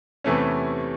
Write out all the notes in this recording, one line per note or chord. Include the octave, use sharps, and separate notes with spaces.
E2 C3 E3 A3 C#4